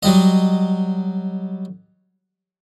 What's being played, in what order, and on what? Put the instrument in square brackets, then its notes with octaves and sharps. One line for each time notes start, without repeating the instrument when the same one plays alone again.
[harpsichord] F#3 G3 D#5